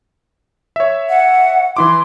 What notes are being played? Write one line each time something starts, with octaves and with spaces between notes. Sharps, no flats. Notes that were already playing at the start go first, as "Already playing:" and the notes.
C#5 E5
F#5
E3 E4 C6 D6